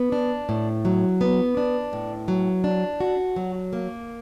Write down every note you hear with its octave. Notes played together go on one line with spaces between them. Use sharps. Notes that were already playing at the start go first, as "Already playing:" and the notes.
Already playing: B3
D4
A2
F#3
B3
D4
A2
F#3
D4
F#4
F#3
A#3